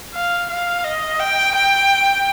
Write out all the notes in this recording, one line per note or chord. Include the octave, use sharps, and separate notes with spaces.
F5
F5
D#5
G5
G5